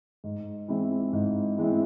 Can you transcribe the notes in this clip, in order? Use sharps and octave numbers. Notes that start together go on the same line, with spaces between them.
G#2
E3 G#3 C4 E4
G#2
E3 G#3 C4 E4